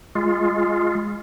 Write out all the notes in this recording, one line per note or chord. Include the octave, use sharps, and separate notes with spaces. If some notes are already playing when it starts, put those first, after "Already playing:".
G#3 F4